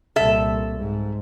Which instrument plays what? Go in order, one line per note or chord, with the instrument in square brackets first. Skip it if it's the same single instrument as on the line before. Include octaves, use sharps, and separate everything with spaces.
[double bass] C2 A#2 [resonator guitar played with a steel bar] A4 E5
[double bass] G#2